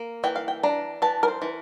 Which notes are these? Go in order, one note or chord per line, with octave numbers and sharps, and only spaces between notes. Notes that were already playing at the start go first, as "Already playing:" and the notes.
Already playing: A#3
E3 G5
F5
G5
D4 A#5
E3 A5
A#4
C5
E3